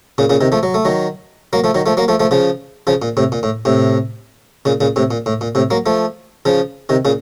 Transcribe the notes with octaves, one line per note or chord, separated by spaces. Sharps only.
A#2 C#3
A#2 C#3
C3 D#3
F3 A3
F#3
A3
D#3 F#3
F#3 A#3
F3 A3
D#3 F#3
F3 A3
F#3 A#3
F3 A3
F3 A3
C#3 F3
C#3 F3
A#2
A2 C3
A#2
A2
A2 C3
A#2 C#3
A#2 C#3
A2 C3
A#2
A2
A#2
A2 C3
F#3 A#3
F3 A3
C#3 F3
C3 D#3
A#2 C#3